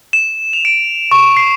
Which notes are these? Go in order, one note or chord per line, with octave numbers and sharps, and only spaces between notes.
E7
F7
D7
C#6
C7